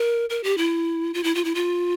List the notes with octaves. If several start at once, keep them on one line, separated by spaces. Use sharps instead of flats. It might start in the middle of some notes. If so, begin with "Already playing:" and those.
Already playing: A#4
A#4
G4
E4
F4
E4
F4
E4
F4